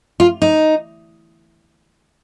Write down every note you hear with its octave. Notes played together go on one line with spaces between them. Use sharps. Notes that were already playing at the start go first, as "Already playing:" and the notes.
F4
D#4